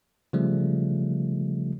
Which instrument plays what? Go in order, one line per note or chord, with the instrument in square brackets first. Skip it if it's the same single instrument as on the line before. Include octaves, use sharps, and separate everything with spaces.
[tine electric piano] C#3 F3 G3 A3